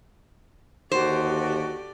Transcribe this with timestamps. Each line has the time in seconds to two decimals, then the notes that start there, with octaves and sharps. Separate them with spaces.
0.91 D#2 D3 F#4 G4 C5 D5